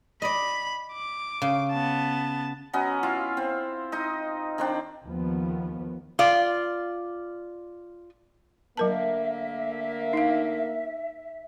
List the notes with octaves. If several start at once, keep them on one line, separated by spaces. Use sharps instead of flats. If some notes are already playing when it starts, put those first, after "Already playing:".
D5 D#5 B5
D6
C#3
B3 A5
F#3 B3 C#4 D#5
E4 F4 F5
C4
D#4 D#5
D#3 C4 D4
D#2 D#3 F3 B3
F4 D5
D3 F#3 A3 A#3 A#4 E5 A5
D#4 F5